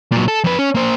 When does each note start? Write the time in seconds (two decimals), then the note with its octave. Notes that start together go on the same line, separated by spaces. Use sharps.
0.12 A#2 F#3
0.28 A4
0.44 F2 B4
0.59 C#4
0.75 A#3 C5